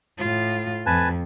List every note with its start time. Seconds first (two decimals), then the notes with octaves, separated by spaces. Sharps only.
0.18 A2 F4
0.86 F2 B4 G#5 A5